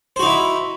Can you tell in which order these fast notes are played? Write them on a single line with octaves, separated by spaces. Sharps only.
C5 F#4 D#4 E4 E5